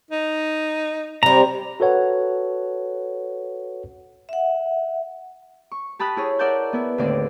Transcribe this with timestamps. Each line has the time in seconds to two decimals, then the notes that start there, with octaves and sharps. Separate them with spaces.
0.11 D#4
1.23 C3 G3 A#5
1.80 F#4 A4 B4 C#5 F#5
4.29 E5 F#5
5.71 C#6
5.99 G4 A5 B5 D#6 F#6
6.16 E4 G#4 C#5
6.39 A#4 D5 E5 F#5 A5 G6
6.73 B3 E4
6.98 D#2 A2 D3 C4 D5 D6